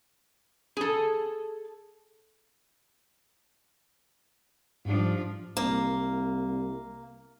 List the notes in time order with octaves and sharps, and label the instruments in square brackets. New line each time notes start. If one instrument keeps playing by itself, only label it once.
[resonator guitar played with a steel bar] G#4 A4
[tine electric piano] G#2 G3 [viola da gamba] F3 D4
[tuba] C2 [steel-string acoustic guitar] A#3